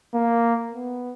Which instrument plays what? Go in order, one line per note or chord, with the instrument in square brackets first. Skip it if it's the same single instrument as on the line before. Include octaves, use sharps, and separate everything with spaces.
[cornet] A#3
B3